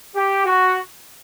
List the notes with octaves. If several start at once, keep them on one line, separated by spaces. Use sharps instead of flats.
G4
F#4